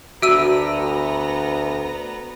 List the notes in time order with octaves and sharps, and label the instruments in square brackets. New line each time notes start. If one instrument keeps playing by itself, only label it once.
[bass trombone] D2 [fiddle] B3 A#5 [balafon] F#4 [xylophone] E5 E6 D#7